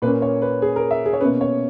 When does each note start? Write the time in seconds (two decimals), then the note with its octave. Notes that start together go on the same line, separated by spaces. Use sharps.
0.02 A#2 A#3 C#4 B4
0.22 C#5
0.42 B4
0.62 G#4
0.76 A#4
0.91 E5
1.06 G#4
1.13 C#5
1.21 B2 A#3 C#4 B4
1.41 C#5